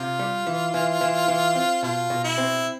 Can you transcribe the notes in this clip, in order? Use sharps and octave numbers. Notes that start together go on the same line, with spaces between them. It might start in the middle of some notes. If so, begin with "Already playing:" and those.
Already playing: C3 F4
G3
E3
E3
E3
E3
C4
B2 F4
B2
E4
C4